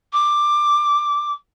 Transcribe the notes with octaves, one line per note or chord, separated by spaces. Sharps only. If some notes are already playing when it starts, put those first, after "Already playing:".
D6